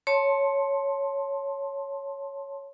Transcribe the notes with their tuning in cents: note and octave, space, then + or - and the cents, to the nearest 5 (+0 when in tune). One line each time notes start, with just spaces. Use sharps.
C#5 +0 A5 +0 C6 +15